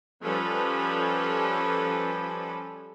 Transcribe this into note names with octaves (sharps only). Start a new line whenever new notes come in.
F3 G3 C#4 A4 B4